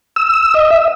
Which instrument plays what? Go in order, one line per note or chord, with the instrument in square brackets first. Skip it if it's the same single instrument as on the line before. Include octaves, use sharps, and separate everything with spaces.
[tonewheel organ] E6
D#5
E5